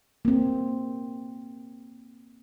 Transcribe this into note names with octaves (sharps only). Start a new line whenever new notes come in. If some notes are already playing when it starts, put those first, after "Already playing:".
A#3 C4